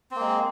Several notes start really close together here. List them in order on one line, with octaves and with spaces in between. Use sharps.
C4 A#3 G#3